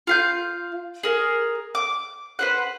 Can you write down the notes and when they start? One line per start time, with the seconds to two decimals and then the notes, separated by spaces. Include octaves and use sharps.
0.07 F4 F5 G6
1.03 G#4 A#4
1.75 D6
2.39 B4 C5 F#5